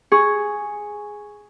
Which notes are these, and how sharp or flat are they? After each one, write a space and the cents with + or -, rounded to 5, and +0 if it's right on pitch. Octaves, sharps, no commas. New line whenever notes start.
G#4 +0 C#6 +0